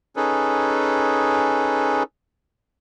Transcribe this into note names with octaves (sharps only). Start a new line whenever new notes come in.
C#4 D#4 G#4 A4 B4